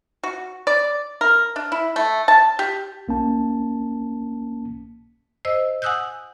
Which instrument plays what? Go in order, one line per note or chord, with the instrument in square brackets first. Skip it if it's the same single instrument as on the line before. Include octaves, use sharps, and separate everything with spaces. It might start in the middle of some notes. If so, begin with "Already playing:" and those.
[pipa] F#4
D5
A#4
D4
E4
A3
A5
G4
[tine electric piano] B1 A#3 C#4 A5
[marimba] C5 D#5 E6
F#5 G#5 D#6 E6 F#6 G6